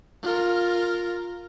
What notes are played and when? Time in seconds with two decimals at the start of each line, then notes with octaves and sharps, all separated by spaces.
0.23 F4 A#4